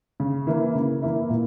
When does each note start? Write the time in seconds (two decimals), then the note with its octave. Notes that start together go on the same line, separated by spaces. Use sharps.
0.20 C#3
0.47 E3 A#3 E4
0.75 C#3
1.02 E3 A#3 E4
1.30 A#2